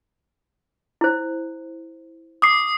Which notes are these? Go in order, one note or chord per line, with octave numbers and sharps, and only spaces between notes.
E4 C5
D6 D#6 C7